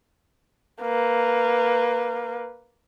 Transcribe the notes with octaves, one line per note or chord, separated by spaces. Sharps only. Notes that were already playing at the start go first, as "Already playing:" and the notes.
A#3 B4